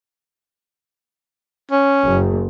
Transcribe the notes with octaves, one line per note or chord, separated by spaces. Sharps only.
C#4
F#1